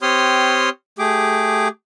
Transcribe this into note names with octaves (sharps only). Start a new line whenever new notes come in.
C4 G4 C#5 C6 D#6 F6
A3 G4 G#4 D6